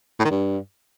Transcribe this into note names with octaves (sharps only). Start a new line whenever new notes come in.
A2
D#3
G2